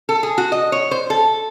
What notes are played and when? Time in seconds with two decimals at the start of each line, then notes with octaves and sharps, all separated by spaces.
0.09 A4
0.23 G#4
0.38 F#4
0.52 D#5
0.72 C#5
0.91 C5
1.10 A4